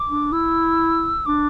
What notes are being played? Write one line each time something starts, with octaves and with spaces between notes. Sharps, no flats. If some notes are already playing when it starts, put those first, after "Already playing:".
Already playing: D6
D4
E4 E6
D4 D6